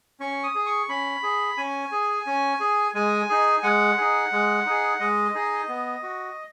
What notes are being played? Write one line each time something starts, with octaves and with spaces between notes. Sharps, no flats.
C#4 C#6
D#6
G#4
C#6
C#4 B5
G#4
C#4 G#5
G#4
C#4
G#4
G#3 G#5
D#4 G#4
G#3 F#5
D#4 G#4
G#3
D#4 G#4
G#3 D#5
D#4 G#4
B3
F#4